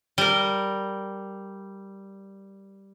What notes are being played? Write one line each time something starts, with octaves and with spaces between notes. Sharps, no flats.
G3 A#4